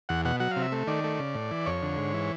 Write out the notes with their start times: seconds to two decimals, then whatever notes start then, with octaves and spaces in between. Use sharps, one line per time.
0.09 E2 F#5
0.25 B2 F#5
0.40 F#3 F#5
0.51 C3 F5
0.62 E5
0.72 A3
0.87 D#3 D5
1.04 A3
1.19 C#3
1.34 A2
1.51 E3
1.66 F2 C#5
1.82 D3
1.98 G#2
2.14 E3